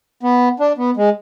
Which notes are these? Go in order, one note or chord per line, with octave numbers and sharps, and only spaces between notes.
B3
D4
B3
G#3